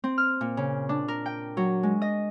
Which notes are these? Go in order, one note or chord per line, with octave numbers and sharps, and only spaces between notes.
C4
F6
A#2
C#3
D4
A#4
G5
F#3
G#3
D#5